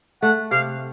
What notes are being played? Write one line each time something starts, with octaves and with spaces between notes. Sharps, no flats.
A3 F#5
C3 F5